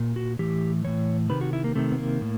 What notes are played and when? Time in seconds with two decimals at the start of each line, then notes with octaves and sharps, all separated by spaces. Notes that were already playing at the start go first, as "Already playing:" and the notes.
Already playing: A#2
0.16 F#4
0.39 A2 E3 G4
0.84 A2 E3 C#5
1.30 C3 D#3 B4
1.41 F#4
1.53 E4
1.64 A#3
1.75 C3 D#3 A3
1.92 B3
1.98 A#3
2.21 A2